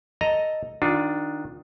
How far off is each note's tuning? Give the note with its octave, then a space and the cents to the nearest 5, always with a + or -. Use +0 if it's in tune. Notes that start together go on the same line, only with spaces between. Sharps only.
A4 +0 D#5 +0 A#5 +0
D#3 +0 D4 +0 F4 +35